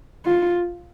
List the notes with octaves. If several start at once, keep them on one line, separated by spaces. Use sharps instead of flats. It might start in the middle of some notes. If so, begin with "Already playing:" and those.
F4